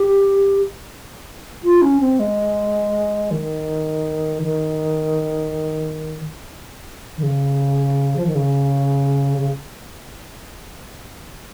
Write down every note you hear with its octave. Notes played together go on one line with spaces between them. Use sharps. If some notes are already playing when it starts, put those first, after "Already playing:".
Already playing: G4
F4
C#4
C4
G#3
D#3
D#3
D#3
C#3
F3
D#3
C#3
C#3